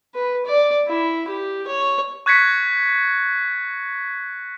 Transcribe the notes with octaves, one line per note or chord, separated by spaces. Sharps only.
B4
D5
E4
G4
C#5
C#6 F#6 G#6 A#6 B6 C#7